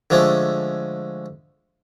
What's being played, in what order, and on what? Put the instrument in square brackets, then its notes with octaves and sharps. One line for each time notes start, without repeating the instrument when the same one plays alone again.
[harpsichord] D3 F3 G#3 A3 C#4